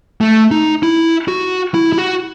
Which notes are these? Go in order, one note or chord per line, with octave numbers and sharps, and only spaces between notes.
A3
D#4
E4
F#4
E4
E4
F#4